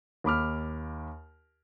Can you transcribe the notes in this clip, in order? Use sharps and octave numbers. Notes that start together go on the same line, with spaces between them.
D#2 B5 D6 F6